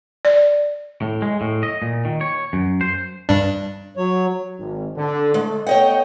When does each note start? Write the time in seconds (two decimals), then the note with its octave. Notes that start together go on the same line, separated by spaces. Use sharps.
0.25 D5
1.02 A2
1.22 G#3
1.41 A2
1.63 D#5
1.82 A#2
2.05 D#3
2.21 C#5
2.53 F#2
2.81 C5
3.29 G2 D4
3.97 F#3 C#5
4.58 G#1
4.96 D3
5.34 G#3 A3
5.66 A3 B3 C#5 D#5 F#5 G5